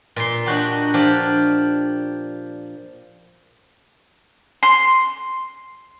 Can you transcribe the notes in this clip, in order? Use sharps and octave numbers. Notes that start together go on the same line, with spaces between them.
A#2 C6
D4 D#4 F#4 G4
F3 D4 G4
C6